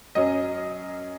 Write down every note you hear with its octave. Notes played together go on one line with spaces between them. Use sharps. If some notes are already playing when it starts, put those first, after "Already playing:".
F#2 F#3 C#4 D#5